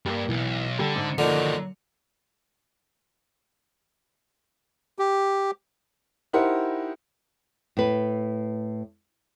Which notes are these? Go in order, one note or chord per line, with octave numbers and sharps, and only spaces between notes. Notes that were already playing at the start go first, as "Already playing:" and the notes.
G2 G3 A#3
B1 E3
D3 G3 A4
G#2
D3 D#3 F3 F#3 A#3 D#4
G4
D#4 E4 G4 A#4 C5 F#5
A2 B4